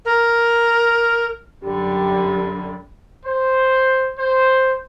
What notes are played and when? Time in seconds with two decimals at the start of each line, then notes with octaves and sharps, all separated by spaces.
0.05 A#4
1.64 F#2 D3 G3 G4
3.25 C5
4.17 C5